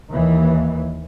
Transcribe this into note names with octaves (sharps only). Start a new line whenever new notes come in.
D#2 E3